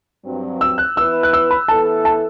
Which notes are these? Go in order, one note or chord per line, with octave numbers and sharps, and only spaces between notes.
G2 F#3 C4
E6
F#6
E3 B3 E4 B4 E6
F#6
E6
B5
E3 B3 E4 A4 A5
A5